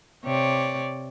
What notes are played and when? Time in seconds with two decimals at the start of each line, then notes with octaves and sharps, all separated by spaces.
0.24 C3 C#5 D5